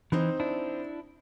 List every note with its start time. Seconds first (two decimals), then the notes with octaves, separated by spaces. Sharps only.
0.12 E3 C4 D#4 C5
0.40 D4 E4